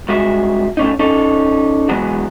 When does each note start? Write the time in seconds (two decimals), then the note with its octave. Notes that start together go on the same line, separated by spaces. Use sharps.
0.08 G2 G#3 F#4 E5
0.77 A3 C#4 D#4
0.99 C#4 D#4 A4
1.89 E3 F#3 G#3 B3